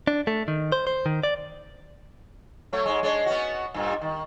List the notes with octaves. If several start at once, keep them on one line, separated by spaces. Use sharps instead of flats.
D4
A3
D#3
C5
C5
D#3
D5
F#3 A3 C#5
G#2 G#3
G#3 D4 C#5
B3 C#4 F#4
G2 A#2 G3
D#3